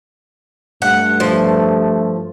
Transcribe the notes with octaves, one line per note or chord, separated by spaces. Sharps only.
G2 A3 F#5
F3